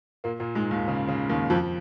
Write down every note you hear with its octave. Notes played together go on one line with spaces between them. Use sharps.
A#2 A#3
A#2 A#3
G#2 G#3
D#2 D#3
C#3
C#3
D#2 D#3
F2 F3